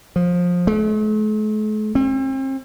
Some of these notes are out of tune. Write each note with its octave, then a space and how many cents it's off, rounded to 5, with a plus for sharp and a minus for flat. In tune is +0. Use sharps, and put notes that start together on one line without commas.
F3 +20
A3 -45
C4 +40